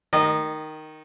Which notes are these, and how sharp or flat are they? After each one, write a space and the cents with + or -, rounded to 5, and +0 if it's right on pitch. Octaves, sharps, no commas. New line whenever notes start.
D#3 +0 D#5 -25